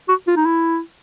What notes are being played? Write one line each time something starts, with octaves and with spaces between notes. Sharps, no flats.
F#4
F4
D#4
E4